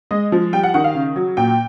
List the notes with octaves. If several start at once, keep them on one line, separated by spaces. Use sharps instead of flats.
G#3 D#5
F3
G3 G5
F#5
D#3 F#5
F5
C#3
F#3
A#2 G5